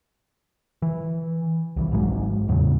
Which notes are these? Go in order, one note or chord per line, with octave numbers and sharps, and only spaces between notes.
E3
C2 D#3 E3
G#1 G#2 F#3 G#3
E2 A2 C#3 F#3